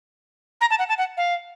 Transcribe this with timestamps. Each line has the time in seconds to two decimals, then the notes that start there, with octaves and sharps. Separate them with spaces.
0.61 A#5
0.70 A5
0.79 F#5
0.89 A5
0.98 F#5
1.17 F5